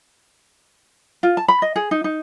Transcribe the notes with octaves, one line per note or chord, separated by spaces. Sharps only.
F4
A5
B5
D#5
G#4
D#4
D#4